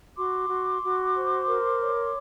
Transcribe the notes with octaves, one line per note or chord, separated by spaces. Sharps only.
F#4 C6 D6
F#4
F#4
C5
A#4
C#5